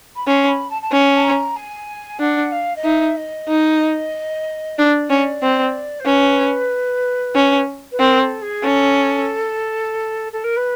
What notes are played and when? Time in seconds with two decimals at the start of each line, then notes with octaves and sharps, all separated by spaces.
0.16 B5
0.27 C#4 C6
0.48 B5
0.70 A5
0.82 A5
0.91 C#4 G#5
1.15 A5
1.23 A#5
1.56 G#5
2.20 D4 F#5
2.52 F5
2.76 D#5
2.84 D#4 E5
3.17 D#5
3.48 D#4
4.77 D4 D5
5.10 C#4
5.42 C4
6.00 C5
6.06 C#4 B4
7.35 C#4
7.91 B4
7.99 C4 A#4
8.21 A4
8.42 G#4
8.63 C#4 A4
10.32 A4
10.44 A#4
10.56 B4